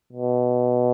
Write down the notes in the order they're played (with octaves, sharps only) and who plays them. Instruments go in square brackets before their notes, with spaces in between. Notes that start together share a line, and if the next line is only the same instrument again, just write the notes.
[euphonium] B2